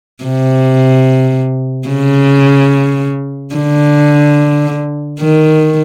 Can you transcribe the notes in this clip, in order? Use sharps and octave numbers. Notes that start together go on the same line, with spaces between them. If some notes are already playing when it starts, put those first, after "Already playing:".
C3
C#3
D3
D#3